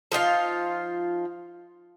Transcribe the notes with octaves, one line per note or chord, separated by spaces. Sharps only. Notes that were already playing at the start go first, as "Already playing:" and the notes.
F3 D#4 F4 F5